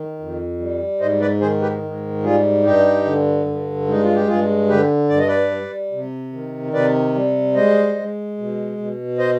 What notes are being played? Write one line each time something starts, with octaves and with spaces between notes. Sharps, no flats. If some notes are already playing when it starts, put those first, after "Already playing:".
Already playing: D#3
F2
G3
G#2 C5 D#5
B4 D5
D#3 G#4 C5
G4 B4
G#2
G3 F4 G#4
G2 D#4 G4
D3
G2
G#3 D#4
F4
G4
G2 F4 G#4
D3 G4 B4
G2 D5
D#5
B4 D5
G3
C3
D#3
C3 B4 D5
G3
G#3 C5 D#5
G#3
B2
B2
C5 D#5